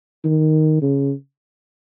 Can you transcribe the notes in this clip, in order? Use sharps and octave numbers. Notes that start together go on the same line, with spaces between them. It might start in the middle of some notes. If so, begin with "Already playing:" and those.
D#3
C#3